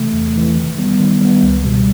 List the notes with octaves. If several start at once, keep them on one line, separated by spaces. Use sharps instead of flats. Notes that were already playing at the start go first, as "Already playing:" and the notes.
Already playing: C3 E3 A3
E2
C3 E3 A3
D#3
G3 B3
D#3
G3 B3
C#2
B2 G3